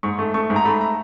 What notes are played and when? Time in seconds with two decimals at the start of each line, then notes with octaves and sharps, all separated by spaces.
0.03 G#2 C#6
0.19 A3
0.34 A3 C#6
0.50 G#2
0.56 A#5
0.65 A3 B5
0.81 A#5